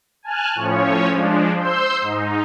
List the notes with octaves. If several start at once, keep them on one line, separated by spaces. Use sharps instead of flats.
G#5 A5 F6 F#6
A2 F3 C#4 C#5
F3 G#3 D4
C5 C6 E6 G6
G#2 D#4